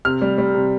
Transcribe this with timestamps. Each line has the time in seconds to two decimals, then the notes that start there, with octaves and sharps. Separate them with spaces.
0.05 C3 F6
0.22 G3
0.38 G3
0.55 C3